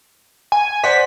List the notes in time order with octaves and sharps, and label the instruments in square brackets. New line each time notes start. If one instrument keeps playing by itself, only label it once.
[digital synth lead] G#5
[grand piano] C5 D5 F#5 [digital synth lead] B6